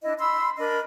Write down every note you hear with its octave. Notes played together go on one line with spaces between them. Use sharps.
D4 E4 D#5
B5 C6 E6
D4 A#4 D#5 B5